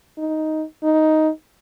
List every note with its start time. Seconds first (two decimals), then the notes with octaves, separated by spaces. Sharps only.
0.18 D#4
0.83 D#4